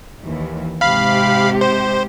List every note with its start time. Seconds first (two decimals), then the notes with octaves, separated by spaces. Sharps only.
0.22 D#2 E3
0.81 G#2 C3 G4 F5 B5
1.61 C5